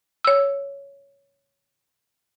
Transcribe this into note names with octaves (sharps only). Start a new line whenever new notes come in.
C#5 E6